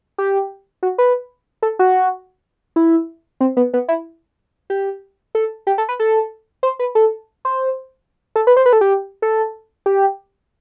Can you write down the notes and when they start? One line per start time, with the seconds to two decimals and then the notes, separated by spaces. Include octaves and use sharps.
0.18 G4
0.83 F#4
0.98 B4
1.62 A4
1.79 F#4
2.76 E4
3.41 C4
3.57 B3
3.74 B3
3.88 E4
4.70 G4
5.35 A4
5.67 G4
5.78 A4
5.89 B4
6.00 A4
6.63 C5
6.79 B4
6.95 A4
7.45 C5
8.36 A4
8.47 B4
8.57 C5
8.66 B4
8.73 A4
8.81 G4
9.22 A4
9.86 G4